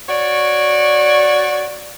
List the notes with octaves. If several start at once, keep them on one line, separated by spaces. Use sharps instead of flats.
F#4 C#5 D5